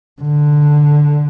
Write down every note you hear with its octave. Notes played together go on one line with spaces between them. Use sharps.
D3